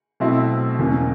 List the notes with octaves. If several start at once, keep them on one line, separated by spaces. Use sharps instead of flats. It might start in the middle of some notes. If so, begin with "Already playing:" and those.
B2 F#3 A3 C4 E4
E2 B2 F#3 A#3 C#4